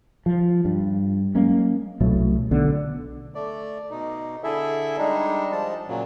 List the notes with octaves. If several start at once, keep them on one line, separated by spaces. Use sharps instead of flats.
F3
G2
F#3 G#3 A#3 C#4
C2 B2 F#3 A3
B1 D3 B3
A3 D5
B2 D#4
D3 E4 G#4 A4 E5
G3 G#3 D4 D#4
F3 G#3 A5
A#2 C#3 F#3